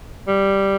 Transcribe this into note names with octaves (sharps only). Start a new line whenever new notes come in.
G3